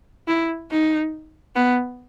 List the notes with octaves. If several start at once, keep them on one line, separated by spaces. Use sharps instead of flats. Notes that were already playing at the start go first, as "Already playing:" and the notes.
E4
D#4
B3